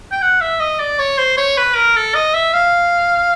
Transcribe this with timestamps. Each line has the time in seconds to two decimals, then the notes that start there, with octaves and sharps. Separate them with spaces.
0.12 G5
0.22 F#5
0.41 E5
0.60 D#5
0.80 D5
0.99 C#5
1.18 C5
1.37 C#5
1.57 B4
1.76 A#4
1.96 A4
2.15 D#5
2.34 E5
2.53 F5